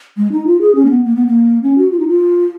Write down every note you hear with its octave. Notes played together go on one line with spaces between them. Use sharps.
G#3
D#4
F4
G#4
C#4
A#3
B3
A#3
B3
A#3
C#4
F#4
F4
D#4
F4